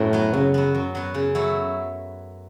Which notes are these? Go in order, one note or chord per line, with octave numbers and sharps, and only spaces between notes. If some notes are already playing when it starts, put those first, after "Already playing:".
Already playing: F#2 A2
F#3 B3
F#2 C#3
F#3 B3
F#2
F#3 B3
C#3
F#3 A3 E4